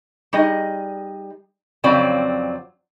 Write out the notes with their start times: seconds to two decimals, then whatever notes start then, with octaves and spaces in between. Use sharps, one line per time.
0.33 G3 D#4 G#4 D#5
1.84 F2 C#3 F#3 C4 D5